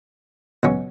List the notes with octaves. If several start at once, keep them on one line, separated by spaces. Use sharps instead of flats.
C#2 B2 F#3 C#4